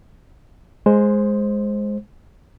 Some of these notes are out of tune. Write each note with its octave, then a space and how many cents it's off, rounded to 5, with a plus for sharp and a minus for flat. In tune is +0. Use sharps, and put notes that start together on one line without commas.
G#3 +0 C5 +10